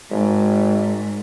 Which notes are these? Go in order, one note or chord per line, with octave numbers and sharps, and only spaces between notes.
G#1 G#2